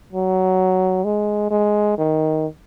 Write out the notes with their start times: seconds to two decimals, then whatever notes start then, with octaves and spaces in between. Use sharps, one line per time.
0.13 F#3
1.05 G#3
1.51 G#3
1.98 D#3